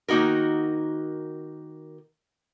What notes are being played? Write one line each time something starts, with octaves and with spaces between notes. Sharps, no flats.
D#3 A#3 D#4 F#4 A#4